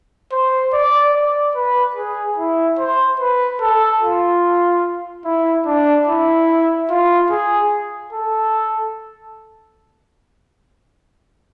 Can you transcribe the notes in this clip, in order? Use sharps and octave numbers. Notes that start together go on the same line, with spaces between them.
C5
D5
D5
B4
G#4
E4
C5
B4
A4
F4
E4
D4
E4
F4
G#4
A4